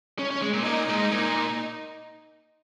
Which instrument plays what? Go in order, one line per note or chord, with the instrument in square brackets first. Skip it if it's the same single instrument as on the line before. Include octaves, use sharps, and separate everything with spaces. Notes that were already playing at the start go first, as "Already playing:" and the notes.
[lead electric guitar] C#4
C#4
G#3
A#2
[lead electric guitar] A#2 [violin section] D#4
[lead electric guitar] G#2
A#2